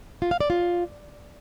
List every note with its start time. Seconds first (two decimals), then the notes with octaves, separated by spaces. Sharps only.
0.22 F4
0.31 F5
0.40 D5
0.50 F4